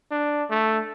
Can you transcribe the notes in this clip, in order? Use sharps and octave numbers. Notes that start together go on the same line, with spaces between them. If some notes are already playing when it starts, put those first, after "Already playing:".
D4
A3